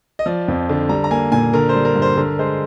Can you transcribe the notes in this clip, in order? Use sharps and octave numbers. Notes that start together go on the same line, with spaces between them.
D#5
F3 D5
F2
D3
G3 A#5
A#5
A#3 G#5
A#2 G#5
D3 A#4
C5
G3
A#4
G2
C5
D3 A#4
G#3 C5